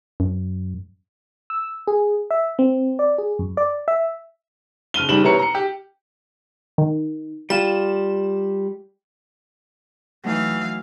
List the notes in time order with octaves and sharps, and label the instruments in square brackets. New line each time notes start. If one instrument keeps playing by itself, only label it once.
[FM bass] F#2
[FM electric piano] E6
G#4
E5
C4
D5
G#4
F#2
D5
E5
[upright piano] F#1 F6 D#7 G7
F#1 D#3 G3 E7 F#7
C3 E3 B3 C#5 A#5 C#7
A#5 C#7
G4
[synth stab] D#3
[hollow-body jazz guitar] G3 F4 [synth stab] E7
[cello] E3 F5 [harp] F#3 A3 D#4